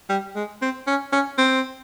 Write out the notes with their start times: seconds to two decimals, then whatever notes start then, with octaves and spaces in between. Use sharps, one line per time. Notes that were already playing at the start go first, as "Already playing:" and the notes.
0.09 G3
0.36 G#3
0.62 C4
0.87 C#4
1.12 C#4
1.38 C4